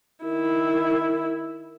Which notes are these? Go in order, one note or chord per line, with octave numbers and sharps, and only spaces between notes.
D#3 E4